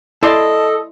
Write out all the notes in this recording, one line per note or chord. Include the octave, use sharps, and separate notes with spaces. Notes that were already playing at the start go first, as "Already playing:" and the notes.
E4 A4 D5 D#5 C6